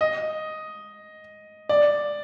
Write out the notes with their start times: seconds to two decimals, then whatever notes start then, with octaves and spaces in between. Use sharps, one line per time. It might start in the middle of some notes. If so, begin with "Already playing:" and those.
0.01 D#5
1.69 D5